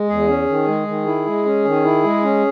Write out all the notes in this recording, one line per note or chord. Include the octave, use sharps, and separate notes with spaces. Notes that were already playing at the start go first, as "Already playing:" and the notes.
Already playing: G#3
E2 G#4
C#4
D#3
G#3
D#3
E4
G#3
C#4
D#3
E4
G#3
C#4